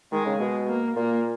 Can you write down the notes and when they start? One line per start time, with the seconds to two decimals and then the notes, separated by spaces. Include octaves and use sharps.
0.12 D#3 G#3
0.26 C#3
0.40 B2 G#3
0.68 A#3
0.96 A#2 A#3